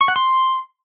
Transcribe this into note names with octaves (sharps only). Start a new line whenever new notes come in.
C#6
F#5
C6